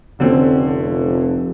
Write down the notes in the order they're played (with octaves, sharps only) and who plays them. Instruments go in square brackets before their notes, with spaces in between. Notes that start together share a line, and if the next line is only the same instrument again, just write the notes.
[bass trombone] F1 [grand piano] D3 C4 C#4